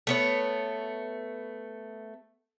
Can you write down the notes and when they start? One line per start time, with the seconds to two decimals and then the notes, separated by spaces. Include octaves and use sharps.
0.07 A3 B3 C#5